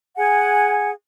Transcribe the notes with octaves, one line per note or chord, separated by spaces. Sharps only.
G#4 F#5 G#5